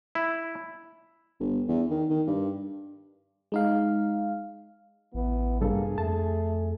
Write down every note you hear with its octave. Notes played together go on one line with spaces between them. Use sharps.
E4
G1
E2
D#3
D#3
G2
G#3 D#4 F5
A1 E3 B3
C2 G2 A#3 G#4 A4
F2 A3 A5